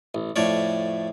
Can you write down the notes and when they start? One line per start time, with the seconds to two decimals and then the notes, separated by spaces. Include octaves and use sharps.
0.15 A1
0.36 F2 A2 A3 C#5 D5